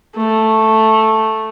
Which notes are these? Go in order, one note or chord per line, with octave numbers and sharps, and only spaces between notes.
A3